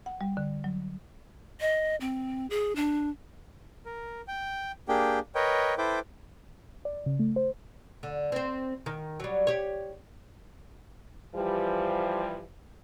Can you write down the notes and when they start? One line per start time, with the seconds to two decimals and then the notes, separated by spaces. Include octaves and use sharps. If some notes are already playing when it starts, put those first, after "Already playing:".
0.06 F#5
0.21 G3
0.37 D3
0.64 F#3
1.61 D#5
2.01 C4
2.50 G#4
2.76 D4
3.85 A#4
4.28 G5
4.89 A#3 D4 G4 G#4 G5
5.35 A#4 B4 C#5 D#5 G5
5.78 E4 A4 B4 C5 G5 D6
6.85 D5
7.06 C#3
7.19 A3
7.36 C5
8.03 D3
8.32 C4 C5
8.86 D#3
9.20 F#3 G3
9.47 G4 C#5
11.36 E3 F3 G3